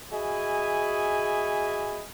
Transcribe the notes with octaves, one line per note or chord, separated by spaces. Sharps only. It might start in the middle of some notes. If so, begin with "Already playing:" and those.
F#4 G#4 D#5 E5 G#5 B5